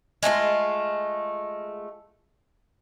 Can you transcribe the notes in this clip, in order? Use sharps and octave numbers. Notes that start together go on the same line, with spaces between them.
G#3 A3 E4 F4